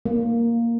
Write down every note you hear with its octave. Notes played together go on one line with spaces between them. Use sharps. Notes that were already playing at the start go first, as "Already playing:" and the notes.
A#3